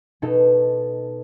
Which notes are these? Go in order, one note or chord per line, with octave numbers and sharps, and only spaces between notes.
B2 D#4 A4